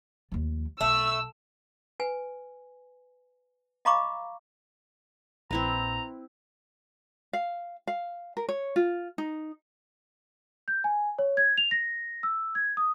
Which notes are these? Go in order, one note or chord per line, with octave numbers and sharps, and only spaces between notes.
D#2 F3
B1 A3 E6
B4 G#5
D#5 F5 A#5 B5 C#6 D6
A#1 C4 E4 B4 A#5
F5
F5
A#4
C#5
F4
D#4
G6
G#5
C#5
G#6
F7
A#6
E6
G#6
D#6